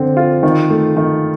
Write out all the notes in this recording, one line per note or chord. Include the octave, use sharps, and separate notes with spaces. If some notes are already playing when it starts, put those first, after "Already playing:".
Already playing: D3 C4
F4
D#3
A3
D#3